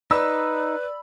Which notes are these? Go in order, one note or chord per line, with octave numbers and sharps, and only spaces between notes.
D#4 B4 D5 B5 E6